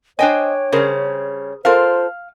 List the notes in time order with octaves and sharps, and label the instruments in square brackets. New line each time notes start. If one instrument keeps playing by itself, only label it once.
[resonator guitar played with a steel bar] D4 G5 G#5 [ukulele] C5 D#5 [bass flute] C#5
[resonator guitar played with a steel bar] C#3 G3 [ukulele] G#4 A#4 C5
[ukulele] F4 A4 A#4 [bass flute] C5 [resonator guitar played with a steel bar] F5